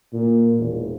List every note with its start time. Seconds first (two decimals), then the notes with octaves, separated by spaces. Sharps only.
0.13 A#2
0.58 E1